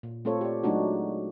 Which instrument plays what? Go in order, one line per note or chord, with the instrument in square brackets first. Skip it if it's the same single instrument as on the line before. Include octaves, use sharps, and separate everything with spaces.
[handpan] A#2
A3 C4 F4 A4 C#5
G4 D5
F#3 G#3 A3 D4 D#4 F#4